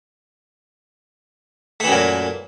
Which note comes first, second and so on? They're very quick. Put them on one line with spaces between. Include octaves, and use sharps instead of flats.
A3 E3 F#2 A#2